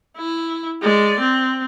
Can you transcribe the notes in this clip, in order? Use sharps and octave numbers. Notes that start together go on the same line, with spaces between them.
E4
G#3 D5
C4